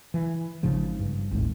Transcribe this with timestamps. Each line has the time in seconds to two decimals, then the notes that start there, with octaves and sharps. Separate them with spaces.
0.14 E3
0.63 G#1 G#2 C#3 F3
1.00 G2
1.31 G#1 D#2 A2